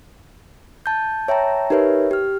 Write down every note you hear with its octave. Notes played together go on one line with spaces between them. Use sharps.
A5 G6
C#5 E5 G5 A5 A#5
D#4 G4 A#4 B4 C#5 E5
G4 F6